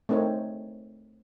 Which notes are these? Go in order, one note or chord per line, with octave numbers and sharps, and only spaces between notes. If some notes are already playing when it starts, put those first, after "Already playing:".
A3 C4 D#4 A#4 C#5